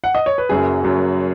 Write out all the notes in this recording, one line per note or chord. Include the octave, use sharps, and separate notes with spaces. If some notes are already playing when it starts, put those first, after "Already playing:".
F#5
D#5
C#5
B4
F#1 F#2 F#3 G#4
F#1 F#2 F#3